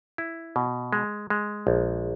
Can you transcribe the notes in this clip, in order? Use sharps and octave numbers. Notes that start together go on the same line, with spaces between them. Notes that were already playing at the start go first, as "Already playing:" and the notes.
E4
B2
G#3
G#3
A#1